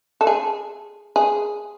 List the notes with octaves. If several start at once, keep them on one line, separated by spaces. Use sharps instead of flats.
A4
G#4
G#4